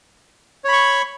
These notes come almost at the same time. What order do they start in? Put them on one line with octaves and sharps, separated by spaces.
C#5 B5 C#6